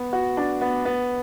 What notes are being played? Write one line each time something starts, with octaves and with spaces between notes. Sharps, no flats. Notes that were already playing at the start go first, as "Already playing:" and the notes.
Already playing: B3
F#4
D4
B3
B3